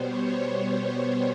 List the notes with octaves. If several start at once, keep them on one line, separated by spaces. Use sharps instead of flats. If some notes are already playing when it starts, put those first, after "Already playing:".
Already playing: B2 G3 B3 C5 C#5